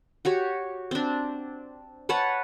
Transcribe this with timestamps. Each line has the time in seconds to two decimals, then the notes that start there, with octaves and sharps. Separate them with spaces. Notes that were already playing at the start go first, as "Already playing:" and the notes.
0.25 F#4 G4 C#5
0.91 C4 D4
2.09 B4 C#5 F#5 A5